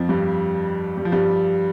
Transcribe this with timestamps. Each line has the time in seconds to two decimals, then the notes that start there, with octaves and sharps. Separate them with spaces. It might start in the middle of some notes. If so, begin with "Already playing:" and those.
Already playing: F2 F3
0.09 G2 G3
0.97 G3
1.05 F3
1.12 G2 G3